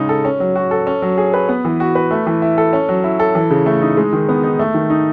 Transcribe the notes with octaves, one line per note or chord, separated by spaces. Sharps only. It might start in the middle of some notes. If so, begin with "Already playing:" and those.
Already playing: C#3 G#3 D#4
A4
C#4
F#3
F#4
A4
C#4
F#3
G#4
B4
B3
E3
F#4
B4
A3
E3
E4
A4
C#4
F#3
E4
A4
E3
C#3
A3
D#4
G#3
D#3
B3
D#4
A3
D#3
D#4